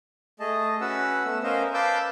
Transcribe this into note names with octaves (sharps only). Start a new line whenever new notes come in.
A3 G#4 D#5 A5
C#4 F#4 B4 F#5 E6
A3 B3 E6
C#4 A#4 C5 D#5 F5
B4 F5 A5 D6 E6 G6